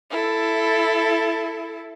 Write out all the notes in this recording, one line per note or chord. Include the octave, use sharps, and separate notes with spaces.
E4 A4